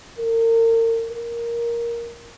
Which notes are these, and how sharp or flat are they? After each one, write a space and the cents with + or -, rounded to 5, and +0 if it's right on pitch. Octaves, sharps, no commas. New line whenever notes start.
A#4 -35
A#4 +5